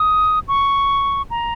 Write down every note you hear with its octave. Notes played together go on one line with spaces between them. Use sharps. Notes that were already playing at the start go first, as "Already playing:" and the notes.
Already playing: D#6
C#6
A#5